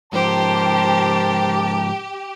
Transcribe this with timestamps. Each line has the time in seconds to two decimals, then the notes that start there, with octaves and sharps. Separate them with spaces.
0.13 G#2 F3 G4 A#4 C5 A5